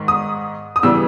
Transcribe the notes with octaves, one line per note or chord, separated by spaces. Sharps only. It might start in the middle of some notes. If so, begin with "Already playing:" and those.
Already playing: G#2 D#3
D#6
D#6
C#3 E3 G3 B3 E6